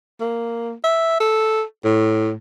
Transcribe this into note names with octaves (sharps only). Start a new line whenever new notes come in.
A#3
E5
A4
A2